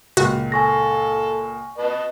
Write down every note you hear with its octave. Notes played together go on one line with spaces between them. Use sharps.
C#2 A#2 F#4
A4 G#5 C#6 A#6
B4 D#5 A5